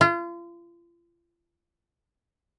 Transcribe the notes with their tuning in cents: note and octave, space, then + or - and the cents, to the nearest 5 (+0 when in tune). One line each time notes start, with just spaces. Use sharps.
F4 -35